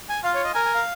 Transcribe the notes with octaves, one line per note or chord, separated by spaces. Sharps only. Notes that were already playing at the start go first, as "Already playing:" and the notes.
G#5
F4 F5
C#5
D#5
A#4 G#5
G#5
F5